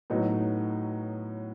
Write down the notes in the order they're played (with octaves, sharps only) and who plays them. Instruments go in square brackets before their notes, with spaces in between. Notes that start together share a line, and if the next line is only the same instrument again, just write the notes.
[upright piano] A2 F#3 B3 D#4 F#4